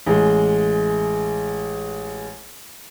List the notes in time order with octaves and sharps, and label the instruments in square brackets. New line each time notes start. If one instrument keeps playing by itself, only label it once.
[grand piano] A1 G#3